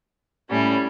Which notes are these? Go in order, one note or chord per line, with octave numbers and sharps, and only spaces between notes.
A2 G3 C#4